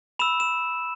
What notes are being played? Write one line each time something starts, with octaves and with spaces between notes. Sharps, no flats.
B5 E6 E7
E7